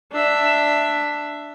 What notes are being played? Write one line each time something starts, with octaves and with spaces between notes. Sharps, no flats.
D4 E5